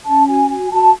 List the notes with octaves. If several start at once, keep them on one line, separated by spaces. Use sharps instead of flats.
C#4 A5
F#4 G#5
F#4 G#5
F#4 A5